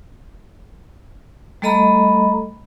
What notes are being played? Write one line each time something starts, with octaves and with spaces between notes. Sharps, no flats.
G3 A3 A4 D#5 A#5 B5